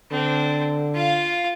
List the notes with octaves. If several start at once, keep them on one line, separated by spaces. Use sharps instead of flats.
D3 C4 D4
F4 F5